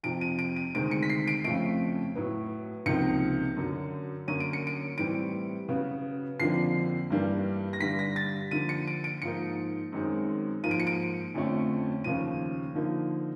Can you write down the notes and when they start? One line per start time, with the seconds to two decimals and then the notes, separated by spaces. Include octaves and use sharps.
0.04 F2 C3 F3 D7
0.21 D#7
0.39 D7
0.56 D#7
0.75 D2 C3 D#3 G#3 C4 D7
0.91 C#7
1.03 B6
1.10 C7
1.28 D7
1.44 F2 C#3 F3 A3 D7
2.15 A2 F#3 B3
2.86 C#2 C3 F3 A#3 D#4 C#7
3.57 F#2 D3 F#3
4.28 F#2 D3 F#3 A#3 C#4 D#7
4.40 D7
4.53 C#7
4.67 D7
4.98 A2 E3 G3 C4 D7
5.69 C#3 F#3 B3
6.40 F2 D3 F3 A#3 D4 C7
7.10 G2 E3 G3 A#3 D4
7.73 A#6
7.80 G2 D3 G3 B6
7.99 A#6
8.16 A6
8.51 D3 F3 A#3 D4 D#7
8.69 C#7
8.88 D7
9.04 D7
9.22 G#2 F3 A#3 D#4 C#7
9.93 F#2 D#3 G#3 C4
10.63 G#2 F3 A#3 D#7
10.71 D7
10.80 C#7
10.87 D7
11.35 F2 D3 F3 A3 C#4
12.04 D#2 C#3 F3 D#7
12.75 D3 F3 A#3 D#4